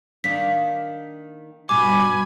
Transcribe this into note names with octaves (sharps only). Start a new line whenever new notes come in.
D#3 A#3 D4 B6
G2 B2 G#5 B5 D6